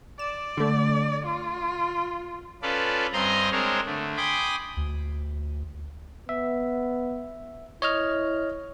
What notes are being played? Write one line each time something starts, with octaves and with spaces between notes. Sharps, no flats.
D5 E7
D3 A3
F4
C#4 F4 A4 B4 D5
G2 C4 D#5 G#5 A#5 C6
G#3 C4 D4 A#4 C5 C#5
D3 A3
G5 G#5 B5 C6 D6 D#6
D2
B3 E5
E4 C#5 D#5 F6